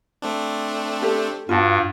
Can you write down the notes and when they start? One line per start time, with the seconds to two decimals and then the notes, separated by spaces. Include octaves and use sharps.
0.22 A3 C4 D4
1.02 G4 A4
1.49 G2 F4 F#4 A5